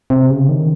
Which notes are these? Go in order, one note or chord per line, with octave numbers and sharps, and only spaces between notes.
C3
C#3
D#3